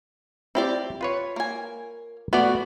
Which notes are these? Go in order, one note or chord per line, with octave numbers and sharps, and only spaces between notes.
C4 E4 G4 D5
F4 B4 C#5
A#3 G#5
A3 B3 F#4 D5